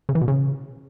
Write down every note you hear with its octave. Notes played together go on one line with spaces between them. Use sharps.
C#3
E3
B2
C#3